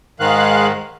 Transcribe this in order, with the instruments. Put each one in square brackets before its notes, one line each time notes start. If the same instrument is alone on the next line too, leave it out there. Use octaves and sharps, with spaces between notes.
[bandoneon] G#2 D#3 [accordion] G#3 F5 F#6